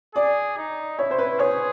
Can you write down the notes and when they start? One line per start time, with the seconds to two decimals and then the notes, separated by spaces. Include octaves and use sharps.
0.15 G#4 D5
0.57 D#4
0.99 E4 C#5
1.11 C5
1.18 B4
1.39 G#4 C#5